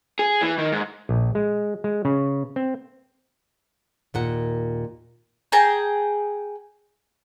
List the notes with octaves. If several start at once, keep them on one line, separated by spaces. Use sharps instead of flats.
G#4
E3
D#3
G#2
A#1
G#3
G#3
C#3
C4
D#2 A#2 F#5
G#4 G5 A5 A#5